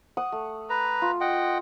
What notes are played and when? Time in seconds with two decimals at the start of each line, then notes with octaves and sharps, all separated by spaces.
0.17 F#5 C#6 D#6
0.32 A3
0.70 B4 A#5
1.02 F4
1.21 D#5 F#5 G5